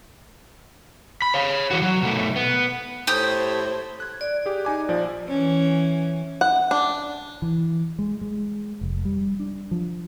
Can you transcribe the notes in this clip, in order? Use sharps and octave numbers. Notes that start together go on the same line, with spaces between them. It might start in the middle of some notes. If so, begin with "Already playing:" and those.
B5
C#5 F5
E3 F#4
F#3
B2 A3
B3
A2 G4 C5 D#6
F#6 G#6
D5
G4 G#4
D#4 G#5 D6
A#1 F3 D5
E3 C#4
F#5
D4
E3
G#3
G#3
F1
G3
D4
F3